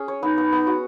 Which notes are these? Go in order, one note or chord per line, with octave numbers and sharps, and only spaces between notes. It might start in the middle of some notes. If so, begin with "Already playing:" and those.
Already playing: C#4 G#4
C#5
B3 D#4
B3
B3
F#4